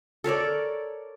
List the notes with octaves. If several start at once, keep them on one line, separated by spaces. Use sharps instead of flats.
A4 A#4 C#5 D5